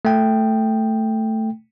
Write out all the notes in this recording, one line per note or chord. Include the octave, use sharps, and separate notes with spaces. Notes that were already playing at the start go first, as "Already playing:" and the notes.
A3 G5